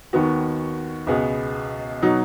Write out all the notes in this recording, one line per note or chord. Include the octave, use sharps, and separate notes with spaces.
D#2 D#3 B3 F#4
C#2 B2 B3 G#4
B2 F#3 D#4 F#4